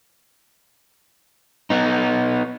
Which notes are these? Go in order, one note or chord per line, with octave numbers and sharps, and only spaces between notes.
B3 D#4